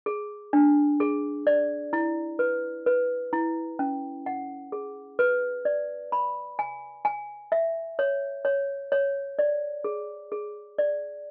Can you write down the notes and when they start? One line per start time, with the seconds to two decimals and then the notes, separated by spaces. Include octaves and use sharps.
0.06 G#4
0.53 D4
1.00 G#4
1.47 D5
1.93 E4
2.39 B4
2.86 B4
3.33 E4
3.79 C#4
4.26 F#5
4.72 G#4
5.19 B4
5.65 D5
6.12 B5
6.59 G#5
7.05 G#5
7.52 E5
7.99 C#5
8.45 C#5
8.92 C#5
9.39 D5
9.84 G#4
10.32 G#4
10.78 D5